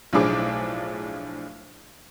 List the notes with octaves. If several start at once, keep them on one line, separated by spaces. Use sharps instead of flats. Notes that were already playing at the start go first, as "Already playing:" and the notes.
B1 A2 F3 D4 G#4 D6